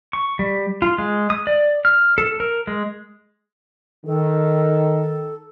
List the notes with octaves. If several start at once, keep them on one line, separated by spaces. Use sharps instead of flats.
C#6
G3
F4
G#3
D#6
D5
F6
A4
A#4
G#3
D#3 A4